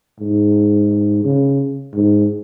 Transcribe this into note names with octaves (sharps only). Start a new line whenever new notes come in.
G#2
C#3
G#2